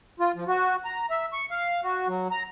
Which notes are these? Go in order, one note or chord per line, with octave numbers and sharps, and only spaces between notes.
F4
F3
F#4
A#5
E5
C#6
F5
F#4
F#3
A#5